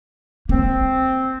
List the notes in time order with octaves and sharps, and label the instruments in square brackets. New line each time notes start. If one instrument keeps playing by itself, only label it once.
[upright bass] A#3 [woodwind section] C4